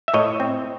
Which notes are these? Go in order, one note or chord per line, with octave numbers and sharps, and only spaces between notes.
E5
A2 C#5 D#5
C4